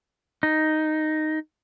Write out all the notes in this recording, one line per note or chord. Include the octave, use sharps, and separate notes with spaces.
D#4